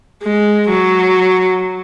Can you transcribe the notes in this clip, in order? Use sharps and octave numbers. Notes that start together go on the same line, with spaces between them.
G#3
F#3